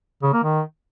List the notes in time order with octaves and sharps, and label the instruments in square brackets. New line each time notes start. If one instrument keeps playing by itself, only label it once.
[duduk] C#3
A#3
D#3